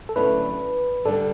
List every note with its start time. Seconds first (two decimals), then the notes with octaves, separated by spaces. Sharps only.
0.09 A4
0.16 D2 D3 F#3 C#4 E4 B4
1.05 D3 G3 B3 D4 A4